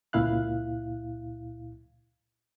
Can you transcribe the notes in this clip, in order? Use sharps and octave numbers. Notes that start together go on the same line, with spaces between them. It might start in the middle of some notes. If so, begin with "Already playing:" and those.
C#2 A#2 E4 F5 F#6